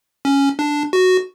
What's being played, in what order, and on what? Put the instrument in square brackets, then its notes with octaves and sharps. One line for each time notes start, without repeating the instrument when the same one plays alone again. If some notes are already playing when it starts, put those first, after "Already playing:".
[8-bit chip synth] C#4
D4
F#4